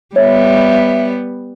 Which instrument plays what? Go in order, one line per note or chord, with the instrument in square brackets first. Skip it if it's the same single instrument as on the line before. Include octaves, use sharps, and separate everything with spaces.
[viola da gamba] G3 B3 [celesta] C#5 [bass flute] E5